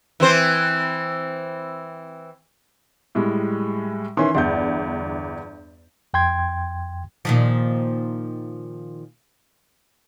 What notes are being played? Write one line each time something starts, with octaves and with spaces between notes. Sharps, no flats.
E3 C4 C5
A2 G3 G#3
D#3 E3 C#4 E4 C6
G1 E2 D5 G6
F2 G5 C6 G#6
A#2 D#3 F3